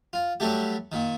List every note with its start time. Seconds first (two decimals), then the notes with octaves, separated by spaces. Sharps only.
0.13 F4
0.40 F#3 G3 A3 G4
0.92 A#2 D#3